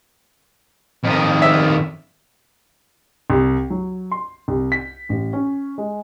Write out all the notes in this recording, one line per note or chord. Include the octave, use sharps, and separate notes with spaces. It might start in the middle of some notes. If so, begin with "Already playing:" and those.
F2 D#3
E5
C2
F#3
C6
C2
B6
A1
C#4
G#3